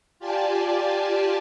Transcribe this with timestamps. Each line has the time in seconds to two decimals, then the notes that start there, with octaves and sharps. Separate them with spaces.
0.19 F4 G4 D5 G#5 A5